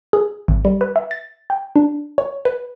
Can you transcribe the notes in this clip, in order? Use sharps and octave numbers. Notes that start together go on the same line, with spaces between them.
G#4
G#1
G3
B4
E5
A6
G5
D4
C#5
B4